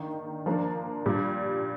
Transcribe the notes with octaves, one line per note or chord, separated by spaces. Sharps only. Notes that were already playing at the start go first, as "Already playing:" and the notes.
Already playing: D#3 A#3 D4
F3 A#3 D4
A#2 G3 D4